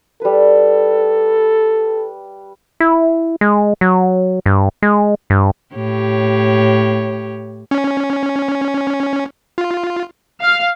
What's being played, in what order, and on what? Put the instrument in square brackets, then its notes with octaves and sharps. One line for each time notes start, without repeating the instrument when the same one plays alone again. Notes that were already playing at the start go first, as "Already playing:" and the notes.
[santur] G3 B4 [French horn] A4
[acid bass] E4
G#3
F#3
G2
G#3
G2
[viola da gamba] A2 G4 C#5
[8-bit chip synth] C#4
F4
[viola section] F5